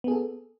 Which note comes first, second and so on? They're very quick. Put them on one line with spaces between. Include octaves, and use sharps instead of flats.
B3 G#4 A4